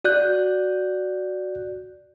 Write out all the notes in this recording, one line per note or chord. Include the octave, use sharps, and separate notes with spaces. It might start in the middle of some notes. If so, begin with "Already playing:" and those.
F#4 D5 F#6 G6